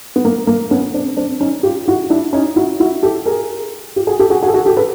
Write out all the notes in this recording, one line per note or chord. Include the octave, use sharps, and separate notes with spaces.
B3
A#3
A#3
B3 C#4
C4 D4
C4 D4
C#4 D#4
F4 G4
E4 F#4
D4 E4
C#4 D#4
E4 F#4
E4 F#4
G4 A4
G#4 A#4
F4 G4
F#4 G#4
G4 A4
F#4 G#4
F#4 G#4
A4
F#4 G#4
G4 A4
A4 B4